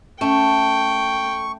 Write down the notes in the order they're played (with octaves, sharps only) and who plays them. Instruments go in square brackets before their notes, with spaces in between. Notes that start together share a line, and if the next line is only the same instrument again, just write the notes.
[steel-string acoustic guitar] A3 [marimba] C#4 [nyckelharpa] G5 [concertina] C#6